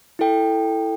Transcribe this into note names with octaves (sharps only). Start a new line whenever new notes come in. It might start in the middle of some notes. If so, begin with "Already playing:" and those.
E4 A4 G5